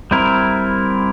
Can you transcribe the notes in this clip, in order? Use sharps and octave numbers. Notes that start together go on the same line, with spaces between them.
G3 C4 E4 A#4